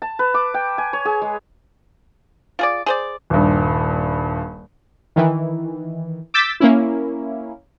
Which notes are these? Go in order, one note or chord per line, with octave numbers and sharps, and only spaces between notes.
A5
B4
D6
G5
G#5
C#5
G#4
G#3
F4 G#4 D5
G#4 C5 D5
D#1 G2
D#3 E3
D6 E6 G6 A6 B6
A#3 C#4 E4